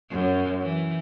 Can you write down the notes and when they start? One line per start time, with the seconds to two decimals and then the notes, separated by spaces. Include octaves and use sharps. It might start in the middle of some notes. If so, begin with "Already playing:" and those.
0.10 F#2
0.61 E3